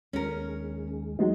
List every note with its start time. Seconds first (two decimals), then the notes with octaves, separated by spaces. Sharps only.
0.13 D#2 G#3 C#4 A#4
1.19 F#3 G#3 D#4